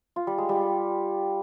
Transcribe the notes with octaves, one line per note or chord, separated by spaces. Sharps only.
F4
G3
G#3
G3